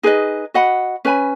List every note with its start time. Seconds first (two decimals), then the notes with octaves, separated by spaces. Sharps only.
0.03 D#4 G#4 B4 D#5
0.54 F#4 D#5 F#5 B5
1.05 C#4 B4 G#5 B5